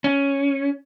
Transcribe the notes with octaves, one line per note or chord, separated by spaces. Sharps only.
C#4